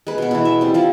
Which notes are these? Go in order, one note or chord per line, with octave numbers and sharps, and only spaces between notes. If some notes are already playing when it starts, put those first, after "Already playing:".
G#3 B4
B2 B3
B2 E3
E5
G3 C4
F3 G3 E4